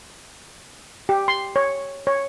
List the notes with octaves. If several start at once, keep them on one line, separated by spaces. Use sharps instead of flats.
G4
C6
C#5
C#5